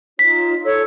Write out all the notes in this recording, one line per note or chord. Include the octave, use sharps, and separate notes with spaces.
D#4 F4 C#5 B6
A4 C#5 E6